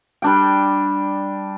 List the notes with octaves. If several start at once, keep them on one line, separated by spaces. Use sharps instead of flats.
G3 D4 G5